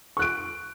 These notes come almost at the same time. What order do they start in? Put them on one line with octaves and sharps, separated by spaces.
C#6 F#6 D7